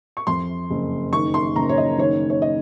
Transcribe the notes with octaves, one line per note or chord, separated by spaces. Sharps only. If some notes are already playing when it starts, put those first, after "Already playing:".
C#6
F2 C6
F#1
D#3 C#6
C6
F#1 A#5
C#5
D#5
D#3 C#5
C#5
D#5